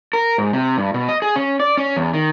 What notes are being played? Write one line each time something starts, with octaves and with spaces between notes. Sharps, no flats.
A#4
G#2
C3
G2
B2
D#5
G#4
C#4
D5
C#4
E2
D#3